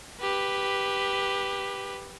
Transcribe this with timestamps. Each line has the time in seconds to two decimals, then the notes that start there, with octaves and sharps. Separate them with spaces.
0.21 G4 B4